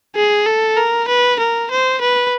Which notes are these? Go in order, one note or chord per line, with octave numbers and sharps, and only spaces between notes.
G#4
A4
A#4
B4
A#4
C5
B4